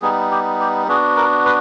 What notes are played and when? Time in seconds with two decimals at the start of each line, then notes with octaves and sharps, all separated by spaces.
0.02 G3 B3 D#4 G#4
0.31 G4
0.60 G4
0.88 B3 D4 F#4 G#4
1.17 A#4
1.45 B4